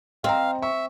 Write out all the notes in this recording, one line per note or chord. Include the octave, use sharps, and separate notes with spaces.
C4 D#5 F5 G5 A#5
E5 C#6